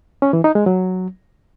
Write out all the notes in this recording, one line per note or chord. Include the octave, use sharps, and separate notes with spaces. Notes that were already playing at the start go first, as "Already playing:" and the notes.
C#4
E3
D#4
G#3
F#3